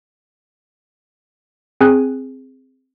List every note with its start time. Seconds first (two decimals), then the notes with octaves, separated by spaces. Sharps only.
1.81 C4 G#4 G#5 F#6